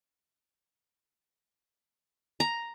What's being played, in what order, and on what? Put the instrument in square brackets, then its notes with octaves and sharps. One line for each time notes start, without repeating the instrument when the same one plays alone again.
[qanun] A#5